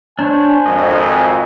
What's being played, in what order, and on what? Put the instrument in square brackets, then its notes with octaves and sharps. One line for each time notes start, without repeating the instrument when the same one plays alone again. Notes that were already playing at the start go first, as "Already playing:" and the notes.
[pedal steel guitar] D4 C5 C#5 [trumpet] G#5
[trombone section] G#1 F2 [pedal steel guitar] D#5